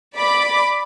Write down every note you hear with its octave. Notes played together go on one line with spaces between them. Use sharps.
D5 B5 D6